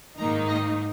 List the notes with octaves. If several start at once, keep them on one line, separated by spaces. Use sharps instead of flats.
G#2 D#3 A#3 D#4 A#5
D#5